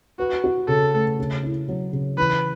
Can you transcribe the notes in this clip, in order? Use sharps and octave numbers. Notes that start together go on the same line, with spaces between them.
F#4 B4
F#4
C#3 A4
A3
C#3
E4
F#3
C#3
E3 B4